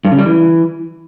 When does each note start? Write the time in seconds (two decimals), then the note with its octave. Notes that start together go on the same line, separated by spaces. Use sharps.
0.05 G2
0.12 C#3
0.19 G3
0.26 E3